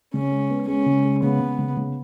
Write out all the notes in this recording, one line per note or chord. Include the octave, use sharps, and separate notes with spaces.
C#3 C#4
G#3
B3
G#3 C#4
C#3
G#3
C#3 B3
C#3
C#3
C#3